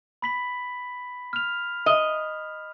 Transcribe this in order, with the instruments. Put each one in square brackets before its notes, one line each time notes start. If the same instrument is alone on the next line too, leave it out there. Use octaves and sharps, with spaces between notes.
[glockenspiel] B5 B6 F#7
F6 F7
[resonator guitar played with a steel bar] D#5